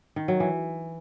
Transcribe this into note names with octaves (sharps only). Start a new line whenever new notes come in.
D#3
F#3
E3